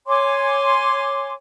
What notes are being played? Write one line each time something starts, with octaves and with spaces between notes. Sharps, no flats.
C#5 G#5 C6 D6